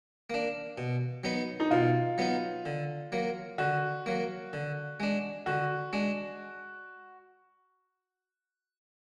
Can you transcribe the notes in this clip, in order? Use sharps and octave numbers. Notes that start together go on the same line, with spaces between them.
A#3 D4
B2
F#3 B3 D#4
D#4
B2 F4
F#3 B3 D#4
D3
F#3 A#3
D3 F#4
F#3 A#3
D3
G#3 D4
D3 F#4
G#3 D4